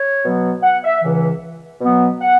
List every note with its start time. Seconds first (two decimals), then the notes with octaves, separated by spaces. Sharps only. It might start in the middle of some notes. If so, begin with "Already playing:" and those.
Already playing: C#5
0.24 B2 F#3 B3
0.63 F#5
0.84 E5
1.03 C#2 C#3 E3
1.81 B2 F#3 B3
2.20 F#5